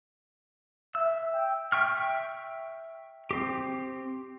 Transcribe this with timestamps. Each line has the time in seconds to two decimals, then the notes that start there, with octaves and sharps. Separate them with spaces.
0.95 E5 E6
1.33 G5
1.72 E5 G5 C#6 F6
3.31 C4 G4